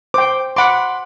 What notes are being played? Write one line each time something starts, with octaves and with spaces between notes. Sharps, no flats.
C5 G5 D6
F#5 B5 C6 D6